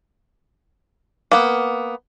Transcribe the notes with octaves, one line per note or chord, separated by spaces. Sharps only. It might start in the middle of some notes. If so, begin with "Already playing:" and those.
A#3 B3